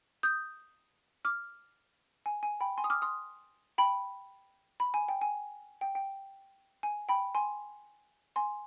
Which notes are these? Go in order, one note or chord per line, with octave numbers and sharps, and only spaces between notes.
D#6 G6
D6 F6
G#5
G#5
G5 B5
G#5 C6
D#6
D6 F6
C6 D#6
G5 B5
B5
G#5
G5
G#5
G5
G5
G#5
G5 B5
G#5 C6
G#5 C6